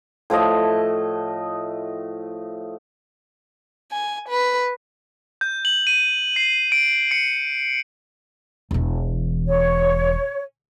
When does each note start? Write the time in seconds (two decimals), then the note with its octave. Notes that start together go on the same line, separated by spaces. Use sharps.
0.30 A2 F3 A3 D#5
3.92 G#5
4.29 B4
5.41 G6
5.65 F#7
5.87 D#7
6.36 C7
6.72 D7
7.11 C#7
8.71 E1 E3
9.47 C#5